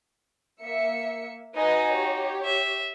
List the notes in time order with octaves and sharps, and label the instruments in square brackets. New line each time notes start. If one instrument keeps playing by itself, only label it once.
[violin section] A#3 E5 C#7
[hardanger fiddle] D#4 F#4 [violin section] B4 D#5 G#5
[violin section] G4 C#5
[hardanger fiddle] E5